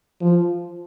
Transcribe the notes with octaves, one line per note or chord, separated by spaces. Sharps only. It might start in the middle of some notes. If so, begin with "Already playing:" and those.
F3